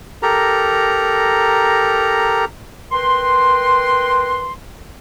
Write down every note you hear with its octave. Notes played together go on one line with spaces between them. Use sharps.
G4 A4 A#4 A#5
A#4 B4 G5 C6